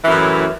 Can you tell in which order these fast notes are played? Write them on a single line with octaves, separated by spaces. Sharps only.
E3 F#2 A2